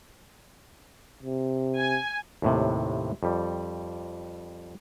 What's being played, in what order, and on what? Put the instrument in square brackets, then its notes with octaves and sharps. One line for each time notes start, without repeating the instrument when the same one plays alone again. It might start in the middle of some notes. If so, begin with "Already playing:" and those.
[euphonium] C3
[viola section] G#5
[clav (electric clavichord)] D#2 A2 C3
F2 G3